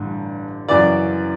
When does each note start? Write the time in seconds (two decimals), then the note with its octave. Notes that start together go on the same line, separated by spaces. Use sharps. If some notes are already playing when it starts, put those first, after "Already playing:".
Already playing: A1 G2 D3
0.68 F#2 C#3 E3 D5